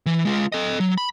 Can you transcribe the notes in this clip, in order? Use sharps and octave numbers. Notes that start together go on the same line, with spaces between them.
E3
G#3 F4
A4 D#5
F#3
B5